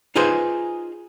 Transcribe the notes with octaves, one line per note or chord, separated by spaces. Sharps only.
D#4 F4 G#4 B4 C5